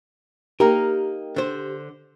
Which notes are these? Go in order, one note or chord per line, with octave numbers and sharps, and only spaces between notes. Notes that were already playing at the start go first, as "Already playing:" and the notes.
A#3 D#4 G4 A#4
D3 C5